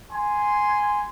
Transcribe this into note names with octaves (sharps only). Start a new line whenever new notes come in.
G#5 C6